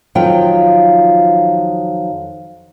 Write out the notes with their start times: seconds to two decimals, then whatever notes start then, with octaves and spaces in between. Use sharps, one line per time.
0.15 F2 D#3 F3 F#3 F4 G5